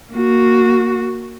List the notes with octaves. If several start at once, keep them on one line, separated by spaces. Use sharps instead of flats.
A#3 F#4